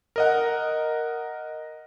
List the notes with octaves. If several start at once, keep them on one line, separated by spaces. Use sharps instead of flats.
A#4 D#5 F#5